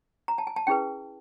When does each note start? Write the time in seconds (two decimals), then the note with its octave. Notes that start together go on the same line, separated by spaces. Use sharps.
0.28 A#5
0.38 A5
0.47 G#5
0.56 A5
0.67 C#4 E4 G#4 B4 G5